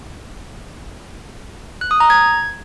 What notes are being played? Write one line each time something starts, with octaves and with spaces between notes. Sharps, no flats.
F#6
D#6
A#5
G#6